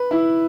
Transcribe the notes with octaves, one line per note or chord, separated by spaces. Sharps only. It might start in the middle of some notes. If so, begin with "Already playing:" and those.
Already playing: B4
E4